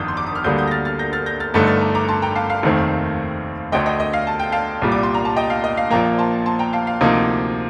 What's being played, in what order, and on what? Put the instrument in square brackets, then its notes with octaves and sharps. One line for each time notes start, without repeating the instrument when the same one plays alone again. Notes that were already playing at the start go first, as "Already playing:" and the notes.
Already playing: [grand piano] G1 F2 D#3 D4 [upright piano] D#6 F6 G6 A6
[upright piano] C6
D6
D#6
F6
[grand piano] D2 D3 G3 A#3 [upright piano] D#6 G6
[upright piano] D#6 G6
A#6
F6 A6
F6 A6
G6 A#6
F6 A6
G6 A#6
F6 A6
[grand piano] G1 G2 D3 A3 D#4 [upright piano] F6 A6
[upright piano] F6 A6
A#5 D6
A#5 D6
A5 C6
G5 A#5
F5 A5
F5
[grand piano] F1 D#2 D#3 A3 C4
[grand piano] D2 D3 A3 [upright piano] D#5 G5
[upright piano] D#5 G5
D#5
F5
A5
G5
F5 A5
[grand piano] C2 A#2 G3
[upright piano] D6
C6
A#5
A5
D#5 G5
F5
D#5
F5
[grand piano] A#1 A#2 F3 A#3 [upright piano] G5 A#5
[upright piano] A5 C6
A5 C6
G5 A#5
F5 A5
F5
[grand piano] D2 C3 F3 A#3 D#4